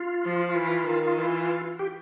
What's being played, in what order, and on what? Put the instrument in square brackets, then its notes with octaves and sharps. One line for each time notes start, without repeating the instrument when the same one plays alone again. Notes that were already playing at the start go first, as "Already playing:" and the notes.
Already playing: [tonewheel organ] F4
[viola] F3
E3
D#3
E3
[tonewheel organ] G4